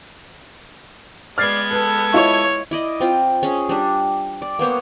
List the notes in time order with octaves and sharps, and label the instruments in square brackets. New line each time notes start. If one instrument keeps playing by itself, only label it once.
[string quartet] G#3 B3 G#6 [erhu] D5 [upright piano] F6 A6 C7
[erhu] A4 [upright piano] B4
[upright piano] E4 F4 D#5 [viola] C#5
[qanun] E4 D5 D#5
C4 F4 G5
C#4 G#4
G3 D4
D5
A#3 B3 C5 C#5